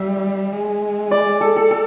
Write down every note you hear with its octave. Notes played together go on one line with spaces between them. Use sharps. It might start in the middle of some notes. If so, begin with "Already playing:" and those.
Already playing: G3 E5
G#3
D5
A4
A4
A4